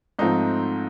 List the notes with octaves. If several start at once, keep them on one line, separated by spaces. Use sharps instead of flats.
G#2 F3 A3 C4 D#4